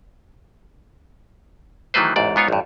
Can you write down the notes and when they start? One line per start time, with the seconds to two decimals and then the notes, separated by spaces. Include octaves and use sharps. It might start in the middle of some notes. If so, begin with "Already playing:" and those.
1.94 D#3 E3 F#3 A3 B4 C5
2.16 A1 E2 G#2 D5
2.36 G#2 B3 F4 C#5
2.48 A1 G2